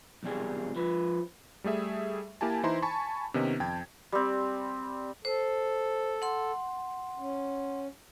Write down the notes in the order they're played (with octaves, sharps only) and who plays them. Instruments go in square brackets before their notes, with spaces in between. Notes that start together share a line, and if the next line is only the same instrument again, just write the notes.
[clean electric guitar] B1 E2 C3 G3 G#4
F3 B4
[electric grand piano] G3 A3 G#4 E5
A#3 E4 G4 G#5 A5
E3 D#4 E4 C5 A#5 C6
G#5 A5 B5 C#6
C3 D#3 B3 C#4 D#4
F2 G5 A5 G#6
[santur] G3 C4
[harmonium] A4 [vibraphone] C5
[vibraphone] F#5 C6
[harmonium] C#4